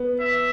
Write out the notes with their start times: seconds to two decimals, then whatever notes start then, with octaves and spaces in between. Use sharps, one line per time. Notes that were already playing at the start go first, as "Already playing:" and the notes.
Already playing: B3
0.20 E5